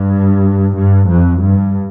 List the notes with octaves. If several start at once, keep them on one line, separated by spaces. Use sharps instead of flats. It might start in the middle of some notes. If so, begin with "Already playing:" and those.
Already playing: G2
G2
F2
G2